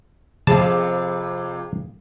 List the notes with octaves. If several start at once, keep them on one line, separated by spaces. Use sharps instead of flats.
F2 C3 G#4 F5 A5